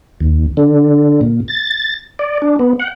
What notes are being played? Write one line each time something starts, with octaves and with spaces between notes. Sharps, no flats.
D#2
D3
A#2
A6
D5
D4
B3
F#5